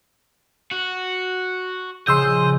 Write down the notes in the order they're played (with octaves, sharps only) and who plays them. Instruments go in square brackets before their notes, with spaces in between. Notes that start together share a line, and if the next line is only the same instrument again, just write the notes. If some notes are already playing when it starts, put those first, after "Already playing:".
[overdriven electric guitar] F#4
[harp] A#1 C#3 [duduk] G#4 [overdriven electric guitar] D#5 [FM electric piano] C6 E6 G6